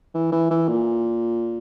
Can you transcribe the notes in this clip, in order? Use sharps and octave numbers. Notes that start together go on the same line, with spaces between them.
E3
E3
E3
A#2